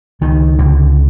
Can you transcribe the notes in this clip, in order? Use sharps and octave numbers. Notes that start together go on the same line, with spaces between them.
C#2 D#3
C#2 D3